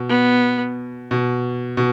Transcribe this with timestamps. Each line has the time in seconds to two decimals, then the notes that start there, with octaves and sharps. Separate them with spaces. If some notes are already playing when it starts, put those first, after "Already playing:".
Already playing: B2
0.09 B3
1.11 B2
1.77 B2